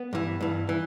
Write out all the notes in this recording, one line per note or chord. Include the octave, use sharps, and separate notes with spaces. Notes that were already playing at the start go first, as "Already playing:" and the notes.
Already playing: B3
G2 E3
G2 E3
E3